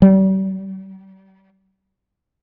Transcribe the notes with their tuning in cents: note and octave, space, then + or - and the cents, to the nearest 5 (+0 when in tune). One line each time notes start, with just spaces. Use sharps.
G3 -40